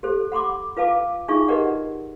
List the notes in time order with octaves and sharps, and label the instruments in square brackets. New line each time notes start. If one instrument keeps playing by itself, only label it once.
[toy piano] G4 A4 C5
F#5 B5 C6 D6
F4 B4 F5 A5 D6
D4 D#4 F4 G#4 E5 C#6
G4 A#4 B4 D5 D#5 F#5